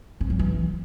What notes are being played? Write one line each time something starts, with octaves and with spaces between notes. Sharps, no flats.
C4
F#3
E3